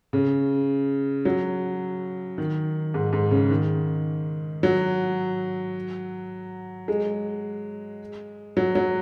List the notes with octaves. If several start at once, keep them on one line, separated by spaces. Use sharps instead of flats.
C#3
F#3
D#3
G#2
G#2
C#3
D#3
F#3
G#3
F#3
F#3